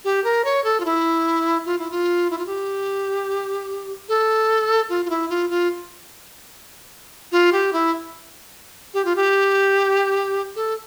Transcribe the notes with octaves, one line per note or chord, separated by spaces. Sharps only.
G4
A#4
C#5
A4
F4
E4
F4
E4
F4
E4
F4
G4
A4
F4
F4
E4
F4
F4
F4
G4
E4
G4
F4
G4
A4